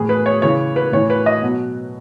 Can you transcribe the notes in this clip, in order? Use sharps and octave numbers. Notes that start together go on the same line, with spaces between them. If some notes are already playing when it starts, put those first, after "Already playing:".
Already playing: A2 E3 G#4
B4
C#5
C#3 E3 C#5
B4
A2 E3 C#5
B4
D#5
B2 F#3